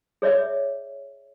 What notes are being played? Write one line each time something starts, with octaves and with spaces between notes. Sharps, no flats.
G#4 C#5 D5 E5